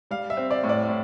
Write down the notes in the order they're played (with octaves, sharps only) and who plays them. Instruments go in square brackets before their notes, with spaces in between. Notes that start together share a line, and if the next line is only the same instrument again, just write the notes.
[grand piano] G3 F5
E5
C4
D5
A2
D5
A2